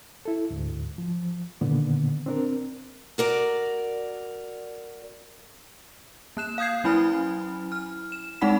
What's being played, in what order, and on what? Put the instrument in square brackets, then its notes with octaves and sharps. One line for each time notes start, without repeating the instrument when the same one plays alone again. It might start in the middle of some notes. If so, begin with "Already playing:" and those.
[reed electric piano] E4 A4
D2 G#2
F3
A#2 D3 D#3 A#3 B3
C4 D4 A#4
[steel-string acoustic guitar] F#4 A#4 D5
[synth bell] A#3 F#6 E7
F5 D#6 G6 G#6 C7
F#3 C#4 E4 G#5 B5 F6
F6
E7
G#3 C4 D#4 F#5 B5 B6